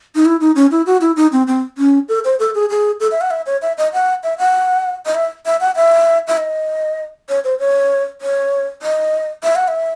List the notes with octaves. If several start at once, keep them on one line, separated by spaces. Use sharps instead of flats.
D#4
E4
D#4
C#4
E4
F#4
E4
D#4
C4
C4
C#4
A4
C5
A4
G#4
G#4
A4
E5
F#5
E5
C#5
E5
D#5
F#5
E5
F#5
D#5
E5
E5
F#5
E5
E5
D#5
C#5
C5
C#5
C#5
D#5
E5
F#5
E5